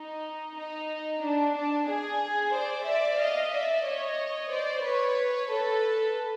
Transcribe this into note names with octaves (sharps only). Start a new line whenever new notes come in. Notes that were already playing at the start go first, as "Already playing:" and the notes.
Already playing: D#4
D#4
D4
D4
G#4
C5 D5
D5 E5
D#5 F5
D5 E5
C#5 D#5
C5 D5
B4 C#5
A4 B4